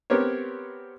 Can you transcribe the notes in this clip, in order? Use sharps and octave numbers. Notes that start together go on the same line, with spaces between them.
B3 C4 G4 A#4 C#5